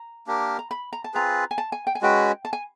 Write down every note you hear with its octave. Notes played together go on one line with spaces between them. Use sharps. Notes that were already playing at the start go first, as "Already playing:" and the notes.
Already playing: A#5
A#3 D4 G4 A#4
A#5
B5
A#5
A5
C4 F4 G#4 B4 A#5
G#5
A5
G#5
G5
G#5
G#3 C#4 F#4 B4 G5
A5
G#5